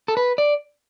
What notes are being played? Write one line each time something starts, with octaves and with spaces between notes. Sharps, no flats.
A4
B4
D5